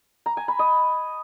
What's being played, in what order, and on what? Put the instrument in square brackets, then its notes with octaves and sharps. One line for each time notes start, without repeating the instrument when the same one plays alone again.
[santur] A#5
G#5
B5
D#5